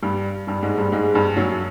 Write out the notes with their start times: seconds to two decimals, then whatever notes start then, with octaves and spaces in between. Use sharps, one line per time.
0.02 G2 G3
0.47 G2 G3
0.63 G#2 G#3
0.78 G2 G3
0.92 G#2 G#3
1.14 G2 G3
1.37 F#2 F#3